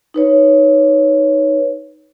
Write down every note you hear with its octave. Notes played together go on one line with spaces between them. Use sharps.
D#4 B4 C#5